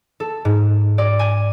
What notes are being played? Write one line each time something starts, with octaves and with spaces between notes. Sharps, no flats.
A4
G#2
D5
G#5